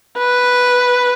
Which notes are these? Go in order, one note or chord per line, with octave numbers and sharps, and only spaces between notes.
B4